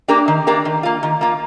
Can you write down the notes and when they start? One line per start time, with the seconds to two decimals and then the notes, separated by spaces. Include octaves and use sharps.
0.08 A#3 D4 G4 A#4
0.28 D#3
0.47 A#3 D4 G4 A#4
0.65 D#3
0.83 A#3 F4
1.03 D#3
1.21 A#3 F4